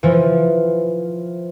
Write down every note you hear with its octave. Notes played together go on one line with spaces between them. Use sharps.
E3 F3